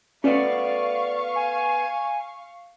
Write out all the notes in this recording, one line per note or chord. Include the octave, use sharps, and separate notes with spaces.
A3 B3 C#4 F#4 D5 F5 C#6
G#5